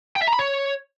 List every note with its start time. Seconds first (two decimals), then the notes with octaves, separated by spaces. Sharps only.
0.16 G5
0.22 E5
0.28 A#5
0.33 B5
0.39 C#5